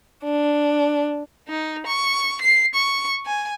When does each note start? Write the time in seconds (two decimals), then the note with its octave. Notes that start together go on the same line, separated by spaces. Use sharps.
0.23 D4
1.48 D#4
1.87 C#6
2.41 C7
2.74 C#6
3.26 G#5